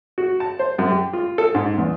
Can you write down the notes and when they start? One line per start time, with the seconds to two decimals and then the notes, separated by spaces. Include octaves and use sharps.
0.18 F#4
0.40 A5
0.59 C5
0.79 F#2
0.91 G4
1.13 F4
1.38 A4
1.55 G#2
1.78 E2